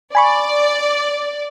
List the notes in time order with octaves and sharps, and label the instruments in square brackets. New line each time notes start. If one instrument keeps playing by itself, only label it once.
[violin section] D5 [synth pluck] G#5 B5 C#6